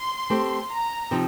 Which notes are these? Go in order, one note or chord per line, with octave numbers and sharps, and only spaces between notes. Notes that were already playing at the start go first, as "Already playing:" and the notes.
Already playing: C6
A3 C4 G4 C5
A#5
C3 F3 C4 D#4